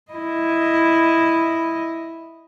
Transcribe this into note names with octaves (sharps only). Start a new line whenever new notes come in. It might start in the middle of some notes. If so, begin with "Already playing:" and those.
E4 D#5